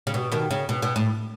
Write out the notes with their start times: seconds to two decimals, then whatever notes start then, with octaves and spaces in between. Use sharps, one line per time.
0.07 C#3
0.14 B2
0.32 B2 D#3
0.51 C#3
0.69 B2
0.82 B2
0.96 A2